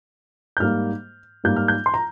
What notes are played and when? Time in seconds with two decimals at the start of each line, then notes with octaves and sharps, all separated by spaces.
0.57 G6
0.60 G#2 G3 A#3 F6
1.44 G#2 G3 A#3 G6
1.56 F6
1.68 G6
1.86 C6
1.94 A#5